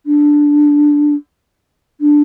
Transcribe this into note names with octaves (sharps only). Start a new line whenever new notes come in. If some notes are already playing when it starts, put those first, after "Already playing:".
D4
D4